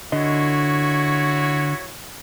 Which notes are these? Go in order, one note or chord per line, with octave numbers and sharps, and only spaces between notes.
D3 E4 F#4 C#5 D#5